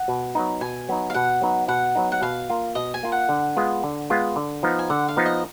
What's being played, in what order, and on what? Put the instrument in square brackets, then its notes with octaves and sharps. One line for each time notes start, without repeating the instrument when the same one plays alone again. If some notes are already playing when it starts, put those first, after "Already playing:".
Already playing: [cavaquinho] F#5
[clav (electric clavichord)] B2
F#3 B3 D#4
[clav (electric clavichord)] B2 [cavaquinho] G#5
[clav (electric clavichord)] F#3 B3 D#4
[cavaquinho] F5
[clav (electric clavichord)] B2 [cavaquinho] F#5
[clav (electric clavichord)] F#3 B3 D#4
[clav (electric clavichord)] B2 [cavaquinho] F#5
[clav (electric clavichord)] F#3 B3 D#4
[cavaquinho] F#5
[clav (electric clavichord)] B2 [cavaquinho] F5
[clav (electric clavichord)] A#3 F4
[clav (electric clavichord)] B2 [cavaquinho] D#5
[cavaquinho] G#5
[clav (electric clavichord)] A#3 F4
[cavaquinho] F#5
[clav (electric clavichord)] D3
G#3 B3 F4
D3
G#3 B3 F4
D3
F3 B3 D#4
[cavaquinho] G#5
[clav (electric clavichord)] D3 [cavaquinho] F#5
[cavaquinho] F5
[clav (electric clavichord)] F3 B3 D#4
[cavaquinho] D#5